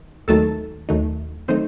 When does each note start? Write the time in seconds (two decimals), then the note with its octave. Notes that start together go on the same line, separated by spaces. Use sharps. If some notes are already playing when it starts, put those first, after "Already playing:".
Already playing: D#3
0.28 D#2 D#3 F#3 A3 D#4 A4 A5
0.89 D#2 D#3 F#3 A3 D#4
1.48 D#3 F#3 A3 C4 D#4 C5